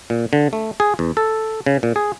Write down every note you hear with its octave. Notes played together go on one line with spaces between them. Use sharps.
A#2
D3
A3
G#4
E2
A4
C#3
A#2
G#4